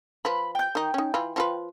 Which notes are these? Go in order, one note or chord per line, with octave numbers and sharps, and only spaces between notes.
F3 B4 B5
G5 G6
D#3 D#4
C#4 D#4
E3 F4 B5
F3 F4 B4